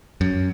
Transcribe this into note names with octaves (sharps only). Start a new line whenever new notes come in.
F#2